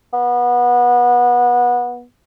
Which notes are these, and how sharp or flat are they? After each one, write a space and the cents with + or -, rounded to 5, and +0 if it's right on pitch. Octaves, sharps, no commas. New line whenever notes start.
B3 -25